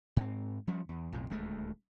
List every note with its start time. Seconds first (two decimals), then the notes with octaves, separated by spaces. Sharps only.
0.16 G#2 C4
0.67 F3 G3 C#4
0.89 E2
1.12 B1 F2 A2
1.30 D#1 D2 G#3 A3